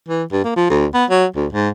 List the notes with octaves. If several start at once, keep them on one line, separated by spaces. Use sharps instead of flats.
E3
G2
A#3
F3
D2
B3
F#3
D2
G#2